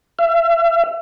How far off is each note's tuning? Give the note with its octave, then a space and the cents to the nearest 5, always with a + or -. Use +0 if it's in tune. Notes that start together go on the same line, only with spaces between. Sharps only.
E5 +40